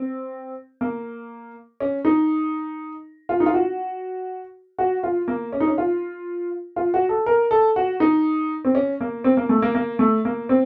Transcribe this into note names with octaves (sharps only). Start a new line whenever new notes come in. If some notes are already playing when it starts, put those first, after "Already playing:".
Already playing: C4
A#3
C#4
D#4
F4
D#4
F4
F#4
F#4
F4
A#3
C#4
D#4
C#4
F4
F4
F#4
A4
A#4
A4
F#4
D#4
C4
C#4
A#3
C4
A#3
A3
A#3
A#3
A3
A#3
C4